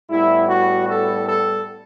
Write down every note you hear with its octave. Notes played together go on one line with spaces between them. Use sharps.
A2 G3 B3 E4
F#4
A4
A4